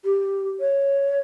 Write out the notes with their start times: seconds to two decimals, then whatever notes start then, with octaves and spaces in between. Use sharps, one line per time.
0.05 G4
0.60 C#5